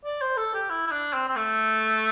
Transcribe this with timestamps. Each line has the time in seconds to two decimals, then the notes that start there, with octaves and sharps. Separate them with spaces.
0.05 D5
0.21 C5
0.37 A4
0.54 G4
0.70 E4
0.87 E4
0.91 D4
1.14 C4
1.28 C4
1.36 A3